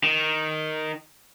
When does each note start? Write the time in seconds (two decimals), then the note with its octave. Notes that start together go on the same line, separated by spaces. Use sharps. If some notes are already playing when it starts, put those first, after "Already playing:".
0.04 D#3